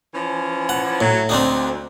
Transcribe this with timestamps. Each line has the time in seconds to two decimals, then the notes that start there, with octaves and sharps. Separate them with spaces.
0.14 E3 F3 C#4
0.69 F#5
1.00 A2 F#3
1.29 D2 C4 D4 D#4